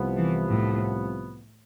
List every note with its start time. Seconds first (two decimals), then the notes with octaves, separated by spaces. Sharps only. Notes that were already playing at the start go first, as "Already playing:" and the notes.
Already playing: C2 C3 F3 B3
0.17 E3
0.49 A2